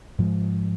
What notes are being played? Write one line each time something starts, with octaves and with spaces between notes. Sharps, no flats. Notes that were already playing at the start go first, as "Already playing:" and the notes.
G#2 F3 G#3